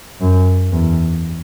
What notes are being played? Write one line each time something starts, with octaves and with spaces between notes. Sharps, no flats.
F#2
E2